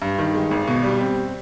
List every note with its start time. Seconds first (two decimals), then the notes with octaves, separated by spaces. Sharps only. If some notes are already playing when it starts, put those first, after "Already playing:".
0.02 G2
0.18 D#3
0.34 G#3
0.51 G#1
0.68 B2
0.84 G3
1.01 C4